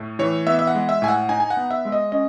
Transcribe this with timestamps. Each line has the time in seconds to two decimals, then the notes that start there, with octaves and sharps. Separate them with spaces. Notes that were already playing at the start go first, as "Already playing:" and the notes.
Already playing: A2 A3
0.19 E3 C#5
0.47 B3 E5
0.59 E5
0.67 F#5
0.75 G#3
0.89 E5
1.02 A2 G#5
1.08 F#5
1.29 D#4 G#5
1.40 G#5
1.50 F#5
1.57 B3
1.71 E5
1.85 G#3
1.92 D#5
2.12 C#4 D#5